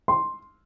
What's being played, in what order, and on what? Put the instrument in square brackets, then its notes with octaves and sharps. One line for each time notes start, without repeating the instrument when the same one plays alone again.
[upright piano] C6